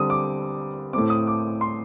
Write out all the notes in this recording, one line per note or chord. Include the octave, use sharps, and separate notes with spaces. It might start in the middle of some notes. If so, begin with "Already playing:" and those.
Already playing: D3 G3 C4 D#6
D6
A2 A3 C4 D6
D#6
D6
C6